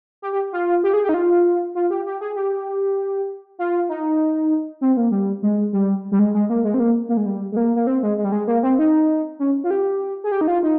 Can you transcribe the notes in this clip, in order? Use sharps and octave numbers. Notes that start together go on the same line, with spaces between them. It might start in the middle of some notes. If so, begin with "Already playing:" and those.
G4
G4
F4
G4
G#4
G4
D#4
F4
F4
G4
G4
G#4
G4
F4
D#4
C4
A#3
G3
G#3
G3
G3
G#3
G#3
A#3
G#3
C4
A#3
A#3
G#3
G3
G#3
A#3
A#3
C4
G#3
G#3
G3
G#3
A#3
C4
D#4
C#4
F4
G4
G#4
G4
D#4
F4
D#4